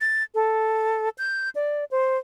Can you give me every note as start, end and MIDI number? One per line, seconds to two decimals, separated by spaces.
0.01 0.23 93
0.35 1.09 69
1.18 1.49 91
1.55 1.84 74
1.91 2.18 72